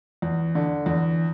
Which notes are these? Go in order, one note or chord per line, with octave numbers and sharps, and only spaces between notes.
E2
D3
E2